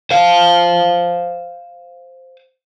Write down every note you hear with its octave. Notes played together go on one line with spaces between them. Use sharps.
C5 F5